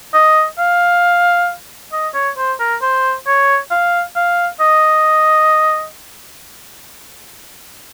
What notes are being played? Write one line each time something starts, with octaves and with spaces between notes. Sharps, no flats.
D#5
F5
D#5
C#5
C5
A#4
C5
C#5
F5
F5
D#5